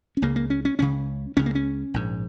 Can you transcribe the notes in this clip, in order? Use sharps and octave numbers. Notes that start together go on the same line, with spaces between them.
C#4
C#2 C#3 A#3
A#3
C#4
C#4
C#2 C#3 C#4
C#2 C#3 C#4
A#3
C#4
A#1 G#2